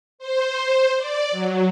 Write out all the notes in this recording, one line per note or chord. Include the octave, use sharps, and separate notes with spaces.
C5
D5
F#3